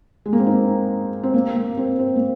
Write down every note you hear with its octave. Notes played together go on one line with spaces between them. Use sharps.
G#3
A#3
C4
D#4
C4
A#3
A#3
C4
C4
A#3